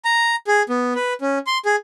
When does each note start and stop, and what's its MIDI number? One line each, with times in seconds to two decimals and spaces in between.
0.05 0.36 82
0.47 0.63 68
0.69 0.93 59
0.95 1.13 71
1.21 1.38 61
1.47 1.58 84
1.65 1.76 68